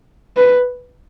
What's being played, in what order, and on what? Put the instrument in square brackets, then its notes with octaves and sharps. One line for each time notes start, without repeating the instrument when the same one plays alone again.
[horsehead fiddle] B4